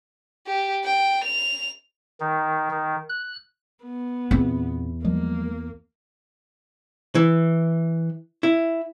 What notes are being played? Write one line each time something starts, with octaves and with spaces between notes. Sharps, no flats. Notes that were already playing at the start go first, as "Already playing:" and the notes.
G4
G5
F7
D#3
D#3
F#6
B3
E2 A#2 C4
F3 G3 G#3 A#3
E3
E4